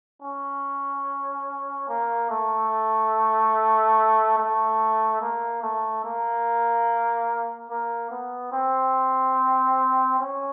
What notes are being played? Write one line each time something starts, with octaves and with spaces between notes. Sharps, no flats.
C#4
A#3
A3
A3
A#3
A3
A#3
A#3
B3
C4
C#4